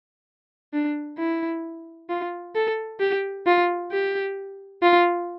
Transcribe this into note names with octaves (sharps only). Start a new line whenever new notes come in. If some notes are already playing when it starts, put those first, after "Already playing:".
D4
E4
F4
A4
G4
F4
G4
F4